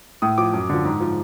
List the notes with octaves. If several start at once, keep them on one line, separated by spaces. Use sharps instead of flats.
A2 D#6
F3 D6
F#2
D3 F3
G#2
F3